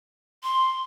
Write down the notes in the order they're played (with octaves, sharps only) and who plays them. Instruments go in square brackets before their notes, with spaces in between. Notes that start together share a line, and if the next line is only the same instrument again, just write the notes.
[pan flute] C6